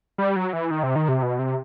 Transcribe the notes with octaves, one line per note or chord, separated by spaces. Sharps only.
G3
F#3
E3
D#3
C3
D#3
C3
B2
C3